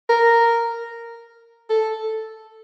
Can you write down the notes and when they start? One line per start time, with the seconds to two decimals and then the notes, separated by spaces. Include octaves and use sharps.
0.09 A#4
1.70 A4